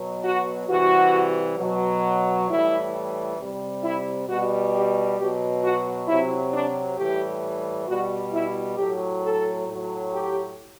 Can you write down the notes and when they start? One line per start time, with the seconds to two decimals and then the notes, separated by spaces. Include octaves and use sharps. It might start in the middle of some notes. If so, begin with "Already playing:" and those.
Already playing: B2 F#3
0.24 F#4
0.69 C3 E3 G3 F#4
1.58 B2 F#3
2.48 A2 E3 G3 E4
3.38 C3 G3
3.84 E4
4.28 B2 G3 F#4
4.73 G4
5.18 B2 F#3 G4
5.63 F#4
6.08 C3 F#3 E4
6.52 D4
6.97 A2 E3 G3 G4
7.87 B2 G3 F#4
8.32 E4
8.77 A2 F#3 G4
9.21 A4
9.67 A2 F#3
10.12 G4